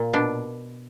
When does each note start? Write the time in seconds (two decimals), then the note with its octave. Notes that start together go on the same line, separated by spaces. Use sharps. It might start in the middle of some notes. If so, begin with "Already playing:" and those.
Already playing: A#2
0.13 B2 D4